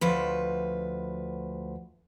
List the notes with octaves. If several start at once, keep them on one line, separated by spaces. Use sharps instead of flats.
D2 F3 B4